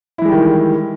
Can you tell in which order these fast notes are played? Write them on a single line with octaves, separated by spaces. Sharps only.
E4 E3 G#3 G3 D#3